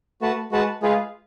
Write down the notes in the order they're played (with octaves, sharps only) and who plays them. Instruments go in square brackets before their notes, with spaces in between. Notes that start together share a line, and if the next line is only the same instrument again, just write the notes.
[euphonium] A3 [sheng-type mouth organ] F#4 B4 F#5 A5
[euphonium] G#3 [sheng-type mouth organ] F#4 B4 F#5 A5
[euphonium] G#3 [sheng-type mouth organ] F4 G#4 B4 F5